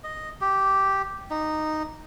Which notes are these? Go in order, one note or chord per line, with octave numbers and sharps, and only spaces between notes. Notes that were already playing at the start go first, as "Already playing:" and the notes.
D#5
G4
D#4